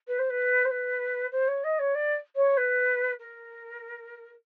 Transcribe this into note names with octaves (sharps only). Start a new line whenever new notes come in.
B4
C5
B4
C5
B4
C5
C#5
D#5
C#5
D5
C#5
B4
A#4